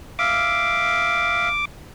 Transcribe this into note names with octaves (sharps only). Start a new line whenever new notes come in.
E5 F5 D6